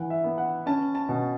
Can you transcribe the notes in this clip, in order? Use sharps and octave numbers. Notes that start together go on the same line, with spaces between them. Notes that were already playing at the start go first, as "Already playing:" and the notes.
Already playing: E3 F#5
E5
B3
F#5
C#4 A5
A5
B2